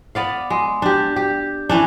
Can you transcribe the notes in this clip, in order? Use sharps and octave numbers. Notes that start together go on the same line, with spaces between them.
B3 D5 F5
G#3
D4 G4
G4
E3 C#4 D4